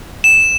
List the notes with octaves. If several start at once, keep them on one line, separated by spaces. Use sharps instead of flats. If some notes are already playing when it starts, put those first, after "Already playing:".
E7